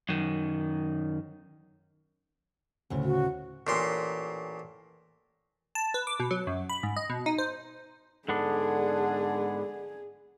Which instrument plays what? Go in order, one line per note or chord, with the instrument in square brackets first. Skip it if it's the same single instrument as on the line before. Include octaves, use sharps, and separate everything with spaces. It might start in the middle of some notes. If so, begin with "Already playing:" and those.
[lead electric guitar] F#2 D#3
[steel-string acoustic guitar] D2 A2 C#3
[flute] F#4
[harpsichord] A1 A#2 C6
[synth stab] A5
B4
D6
B2
F#3
F#2
B5
G#2
D#5
B2
D#4
C5
[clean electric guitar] G#2 B3 D4 [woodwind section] D3 [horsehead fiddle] G#4